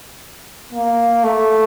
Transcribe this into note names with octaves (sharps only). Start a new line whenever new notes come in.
A#3
A3